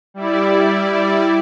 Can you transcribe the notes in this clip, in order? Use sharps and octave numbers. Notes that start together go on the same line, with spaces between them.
G3 E4 D5